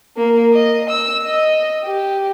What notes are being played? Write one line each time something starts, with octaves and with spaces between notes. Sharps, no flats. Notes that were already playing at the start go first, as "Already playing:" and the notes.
A#3
D#5
E6
D#5
G4